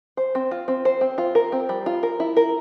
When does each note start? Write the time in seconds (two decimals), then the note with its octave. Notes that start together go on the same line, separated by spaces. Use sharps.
0.17 C5
0.35 C4
0.51 F4
0.68 C4
0.85 C5
1.01 C4
1.18 F4
1.35 A#4
1.52 C4
1.69 G3
1.86 F4
2.03 A#4
2.20 E4
2.37 A#4